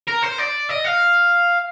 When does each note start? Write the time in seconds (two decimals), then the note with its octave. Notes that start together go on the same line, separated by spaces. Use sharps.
0.08 A#4
0.23 C5
0.39 D5
0.70 D#5
0.85 F5